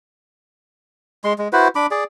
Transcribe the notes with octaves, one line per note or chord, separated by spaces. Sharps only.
G#3 C6
G#3
E4 F#4 B4 C5
D4 B5 D6
G#4 D5